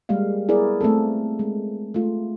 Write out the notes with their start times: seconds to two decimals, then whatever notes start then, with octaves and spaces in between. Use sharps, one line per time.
0.09 G3 G#3 A#3 F5
0.48 B3 E4 G#4 A#4 D5
0.81 A3 A#3 C4 A4
1.39 G#3
1.94 A3 F4